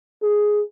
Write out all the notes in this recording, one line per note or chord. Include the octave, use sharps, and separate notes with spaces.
G#4